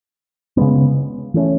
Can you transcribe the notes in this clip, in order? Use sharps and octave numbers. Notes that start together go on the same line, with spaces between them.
C#3 G#3 B3
E3 A3 C#4